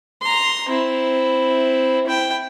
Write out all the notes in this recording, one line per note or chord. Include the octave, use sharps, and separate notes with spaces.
A#5 C6
C4 E4
E4 G5